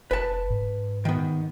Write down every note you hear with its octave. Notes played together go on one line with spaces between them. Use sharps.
F1 B4 A5
G#2
D#3 B3